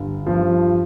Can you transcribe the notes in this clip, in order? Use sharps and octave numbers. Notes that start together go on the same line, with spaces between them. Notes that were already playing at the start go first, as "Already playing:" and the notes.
Already playing: G1
G2 F3